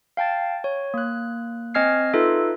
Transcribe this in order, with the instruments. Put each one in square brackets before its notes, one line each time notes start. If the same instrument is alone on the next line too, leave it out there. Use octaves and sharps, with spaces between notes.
[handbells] F5 G5 A5 A6
C#5
A#3 F#6
C4 D#5 G#5 F6 G#6 C7
D#4 F4 A4 B4 E5